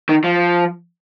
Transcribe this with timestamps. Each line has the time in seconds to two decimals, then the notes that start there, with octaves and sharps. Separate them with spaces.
0.09 D#3
0.24 F3